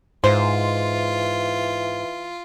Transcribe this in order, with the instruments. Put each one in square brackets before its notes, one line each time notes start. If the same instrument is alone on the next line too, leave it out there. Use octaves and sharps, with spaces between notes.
[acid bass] G#2 [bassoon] E3 [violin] F4 [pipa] C5